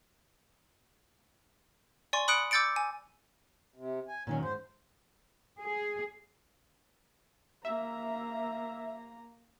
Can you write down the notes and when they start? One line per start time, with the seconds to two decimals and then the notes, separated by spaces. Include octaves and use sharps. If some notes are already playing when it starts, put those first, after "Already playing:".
2.13 D5 G#5 C6 C#6
2.28 B5 D#6 F#6 C#7 D7
2.51 D6 E6 G6 A6 C#7 D7
2.76 G#5
3.75 C3
4.08 G#5
4.27 A#2 D#3 F#3 C#4
4.43 G#2 C5
5.60 G#4
7.65 A#3 E5 A#5